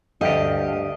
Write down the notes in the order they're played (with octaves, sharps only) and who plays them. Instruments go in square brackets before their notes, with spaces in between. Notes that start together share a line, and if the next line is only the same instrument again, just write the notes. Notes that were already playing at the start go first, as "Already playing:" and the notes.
[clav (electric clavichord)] D2 G4 [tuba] G2 [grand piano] A4 F5 G5 [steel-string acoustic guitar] D#5